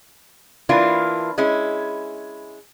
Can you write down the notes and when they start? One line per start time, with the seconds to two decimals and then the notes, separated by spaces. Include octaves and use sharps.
0.69 E3 A#3 D4 E4 F4
1.38 G#3 C#4 E4